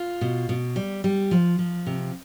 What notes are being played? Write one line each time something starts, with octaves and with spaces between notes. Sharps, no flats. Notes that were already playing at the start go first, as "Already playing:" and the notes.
Already playing: F4
B2
B2
G3
G3
F3
F3
C3